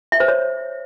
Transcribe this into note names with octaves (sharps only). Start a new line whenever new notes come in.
E5
C5
C#5